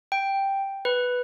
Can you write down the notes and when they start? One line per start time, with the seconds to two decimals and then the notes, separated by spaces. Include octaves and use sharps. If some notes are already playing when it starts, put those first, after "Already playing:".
0.12 G5
0.85 B4